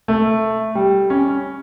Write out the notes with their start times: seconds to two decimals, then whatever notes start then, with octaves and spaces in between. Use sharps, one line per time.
0.08 A3
0.75 G3
1.10 C#4